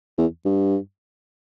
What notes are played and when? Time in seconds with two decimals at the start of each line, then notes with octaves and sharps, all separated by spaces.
0.18 E2
0.45 G2